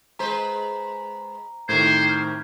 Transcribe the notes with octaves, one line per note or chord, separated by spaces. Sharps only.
G#3 B4 C5 A#5
A2 C3 D#3 A#4 C5 G#6
F6 G6